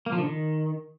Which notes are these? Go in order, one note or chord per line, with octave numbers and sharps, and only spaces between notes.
A#3
F3
D3
D#3